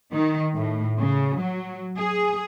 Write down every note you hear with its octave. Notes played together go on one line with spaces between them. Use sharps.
D#3
A2
C#3
F#3
G#4